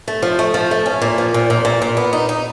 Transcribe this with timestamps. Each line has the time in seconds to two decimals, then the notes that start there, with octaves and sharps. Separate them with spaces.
0.08 A3
0.22 F3
0.39 A3
0.54 F3
0.71 A3
0.86 C#4
1.02 A#2
1.18 F3
1.34 A#2
1.50 A#2
1.65 A#2
1.82 A#2
1.97 B3
2.13 D#4
2.29 D#4